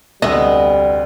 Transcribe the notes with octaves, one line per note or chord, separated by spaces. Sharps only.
F1 D2 G3 B3 D#5 E5